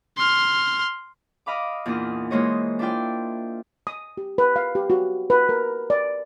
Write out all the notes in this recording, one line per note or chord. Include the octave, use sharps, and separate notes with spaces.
C6 F6
D#5 F5 B5 D6
E2 A#2 D4 F4 D#5
E3 G#3 A#3 C5 C#5 D#5
D4 E4 F4 D5 G5
D#6
G4
B4
F5
G4
F#4
B4
A#4
D5